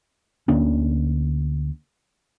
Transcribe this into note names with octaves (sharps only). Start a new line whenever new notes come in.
D2 D3 A#3 C#4